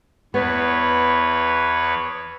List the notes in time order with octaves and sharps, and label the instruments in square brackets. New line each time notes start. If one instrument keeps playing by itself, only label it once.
[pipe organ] E2 B4 C#5 [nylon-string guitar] B3